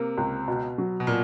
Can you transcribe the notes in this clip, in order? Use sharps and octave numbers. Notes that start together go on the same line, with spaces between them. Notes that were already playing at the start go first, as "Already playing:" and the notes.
Already playing: C3 A#3
C#2
B2
F#3
B2
A#2 A#3